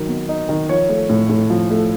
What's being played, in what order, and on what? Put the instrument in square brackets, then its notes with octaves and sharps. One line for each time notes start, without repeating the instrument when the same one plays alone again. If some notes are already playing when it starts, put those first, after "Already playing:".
Already playing: [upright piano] D#3 F#3
B3
D#4
D#3
F3 C#5
A3
A2
A2
F3
A3